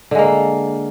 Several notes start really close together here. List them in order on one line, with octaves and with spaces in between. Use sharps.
D3 G#3 A#3